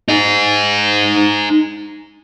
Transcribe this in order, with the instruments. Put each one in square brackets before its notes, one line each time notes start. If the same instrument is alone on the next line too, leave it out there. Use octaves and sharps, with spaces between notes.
[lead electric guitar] D#4 G#4